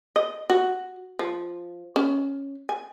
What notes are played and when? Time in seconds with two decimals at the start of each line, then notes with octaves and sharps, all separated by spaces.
0.16 D#5
0.50 F#4
1.19 F3
1.96 C#4
2.69 G#5